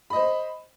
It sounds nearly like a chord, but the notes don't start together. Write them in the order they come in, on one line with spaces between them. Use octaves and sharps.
B5 D#5 C5